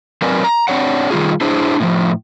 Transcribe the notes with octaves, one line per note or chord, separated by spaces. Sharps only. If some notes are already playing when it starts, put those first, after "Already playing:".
F#3 C4 A#4 B4 D5 G#5
A#5
C4 D4 C#5 F#5
D#3 G3 F4 G#4
D4 E4 G#4 C5
A2 D#3 F3